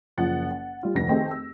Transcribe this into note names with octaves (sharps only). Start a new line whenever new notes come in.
F#1 F3 F#5 A6
F#5
G3 F4
F1 D2 A#6
D#3 A3 C4 D#4 G4 G#4
E6